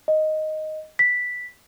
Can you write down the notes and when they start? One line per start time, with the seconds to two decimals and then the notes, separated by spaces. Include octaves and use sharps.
0.08 D#5
0.99 B6